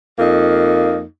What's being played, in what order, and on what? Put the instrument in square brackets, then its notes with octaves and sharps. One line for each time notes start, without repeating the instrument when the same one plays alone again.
[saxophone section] F2 A#3 D#4